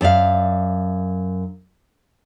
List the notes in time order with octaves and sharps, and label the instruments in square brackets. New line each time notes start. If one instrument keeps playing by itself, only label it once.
[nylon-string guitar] F#2 D5 E5 F5